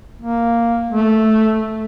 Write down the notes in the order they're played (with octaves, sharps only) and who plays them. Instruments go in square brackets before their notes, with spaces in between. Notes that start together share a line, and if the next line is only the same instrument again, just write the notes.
[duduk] A#3
A3